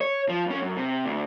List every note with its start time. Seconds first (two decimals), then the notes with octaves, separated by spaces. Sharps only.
0.01 C#5
0.29 F3
0.46 F2 C#4
0.62 F#2
0.77 C3
1.05 D2